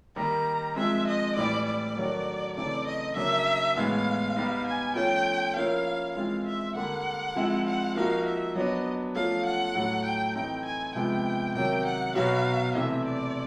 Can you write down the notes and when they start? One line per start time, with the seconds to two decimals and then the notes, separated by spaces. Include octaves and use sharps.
0.16 D#3 G3 A#3 D#4 A#5
0.76 F3 G#3 C4 E5
1.07 D#5
1.36 A2 E3 G3 D5
1.66 D5
1.96 D#3 F#3 A3 D4 F#4
2.56 C#3 E3 A3 C4 D#4 D5
2.87 D#5
3.16 C#3 F#3 A#3 D4 E5
3.76 A2 E3 G#3 B3 F5
4.36 G3 B3 D#4
4.66 G#5
4.95 F3 A3 C#4 F4 G5
5.56 F3 A#3 C#4 E4 F5
6.15 E3 G#3 C4 F4 F5
6.46 E5
6.75 D3 G3 A#3 F#5
7.36 F3 G#3 C4 E4
7.66 F#5
7.95 F3 A#3 D#4 F#4 F5
8.26 E5
8.55 F#3 B3 D4 D#5
9.15 F3 A3 C#4 F4 F5
9.46 F#5
9.75 A2 F#3 A3
10.05 G5
10.35 E3 A3 C4 D#4 G5
10.65 G#5
10.95 C3 F3 G#3 B3 G5
11.55 C3 D#3 F#3 G5
11.85 F#5
12.15 B2 F#3 B3 D#4 F#4 F5
12.75 C3 E3 A3 C4 E5
13.05 D5